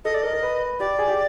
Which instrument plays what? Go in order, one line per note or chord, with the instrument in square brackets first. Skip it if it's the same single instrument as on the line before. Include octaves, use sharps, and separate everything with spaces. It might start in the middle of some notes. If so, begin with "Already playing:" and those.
[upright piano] A4 [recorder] D#5
[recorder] D5
[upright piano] A#4 [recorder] D#5
[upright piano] A#4
B4
[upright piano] G4 [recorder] D5
[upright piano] G#4
G4